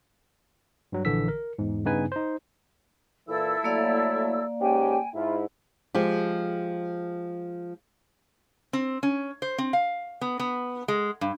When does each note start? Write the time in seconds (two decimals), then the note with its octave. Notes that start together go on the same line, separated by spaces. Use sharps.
0.92 G2 F#3
1.05 A#1 D3 E3 E6 B6
1.28 A#4
1.59 E2 G#2
1.85 G2 C#3 B3 D#4 B4 G#5
2.12 D#4 C5
3.28 A#2 E3 E4 A4 E6
3.64 F#3 A3 A#3 D5 F5
4.61 G#2 C#4 G4 G5 G#5
5.13 G#2 E4 F4
5.95 F3 G#3 G4
8.73 C4
9.03 C#4
9.42 C5
9.58 C4
9.73 F5
10.21 B3
10.40 B3
10.88 G#3
11.21 G2